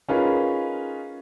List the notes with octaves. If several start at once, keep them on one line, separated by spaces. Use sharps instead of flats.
C#4 D#4 F4 G#4 A#4 B4